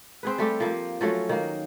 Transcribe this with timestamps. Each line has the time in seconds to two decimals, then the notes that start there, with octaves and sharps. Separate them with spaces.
0.23 C4 G#4 B4
0.38 G3 A3 G4
0.60 F3 A#3
1.01 F3 F#3 A3 C#4
1.29 D#3 A#3